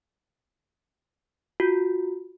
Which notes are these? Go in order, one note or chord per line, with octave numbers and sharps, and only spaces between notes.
F4 F#4